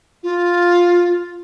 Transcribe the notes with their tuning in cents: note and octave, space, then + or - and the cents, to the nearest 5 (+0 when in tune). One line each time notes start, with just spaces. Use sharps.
F4 +5